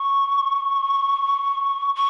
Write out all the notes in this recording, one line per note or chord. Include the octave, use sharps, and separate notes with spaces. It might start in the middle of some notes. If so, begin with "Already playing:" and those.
Already playing: C#6
C#6